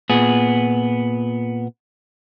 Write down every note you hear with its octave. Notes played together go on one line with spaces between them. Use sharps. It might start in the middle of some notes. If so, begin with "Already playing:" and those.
A#2 B3 G#4